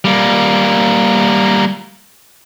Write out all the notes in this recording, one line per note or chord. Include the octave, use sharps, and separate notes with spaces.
G3 A#3